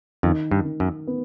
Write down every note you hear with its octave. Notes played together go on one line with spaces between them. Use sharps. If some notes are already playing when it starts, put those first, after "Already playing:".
F2 D#3
G2
D#3
F#2
B3